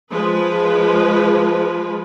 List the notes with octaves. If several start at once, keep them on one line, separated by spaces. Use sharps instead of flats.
F3 G#3 B4